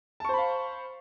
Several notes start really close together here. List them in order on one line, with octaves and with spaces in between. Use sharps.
A5 C#6 C5 B5 F5